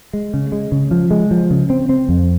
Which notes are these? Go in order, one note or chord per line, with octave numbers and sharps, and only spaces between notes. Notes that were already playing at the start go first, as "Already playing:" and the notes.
G#3
C#3
G#3
C#3
F3
G#3
F3
C#3
C4
C4
F2